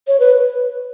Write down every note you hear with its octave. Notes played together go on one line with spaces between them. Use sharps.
C#5
B4